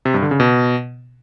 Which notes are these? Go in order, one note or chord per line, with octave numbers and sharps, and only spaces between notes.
C3
G2
D3
C#3
B2